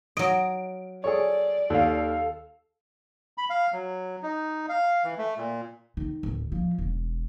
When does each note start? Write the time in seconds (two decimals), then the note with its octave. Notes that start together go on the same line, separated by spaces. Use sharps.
0.17 F#3 D#5 D7
1.04 G#4 A4 C#5 D5
1.70 D#2 A4 F5
3.38 B5
3.50 F5
3.72 F#3
4.23 D#4
4.69 F5
5.04 E3
5.18 A3
5.37 A#2
5.97 D#3
6.23 D1
6.52 F3
6.78 E1